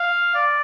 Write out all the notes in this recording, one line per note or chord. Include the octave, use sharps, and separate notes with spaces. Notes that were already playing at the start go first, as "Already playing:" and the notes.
Already playing: F5
D5